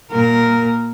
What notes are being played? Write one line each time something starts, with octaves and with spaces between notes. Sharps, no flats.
A#2 A#4